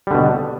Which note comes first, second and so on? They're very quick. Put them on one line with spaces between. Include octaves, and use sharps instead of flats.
G3 D3 B2